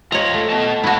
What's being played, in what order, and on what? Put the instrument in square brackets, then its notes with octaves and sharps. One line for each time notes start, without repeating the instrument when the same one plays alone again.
[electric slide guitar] F4 D#5 [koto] C#5 A#5
[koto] A3
[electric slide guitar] B3 D#5 A5
[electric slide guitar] G#2 C#5 A5 [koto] E4 F#4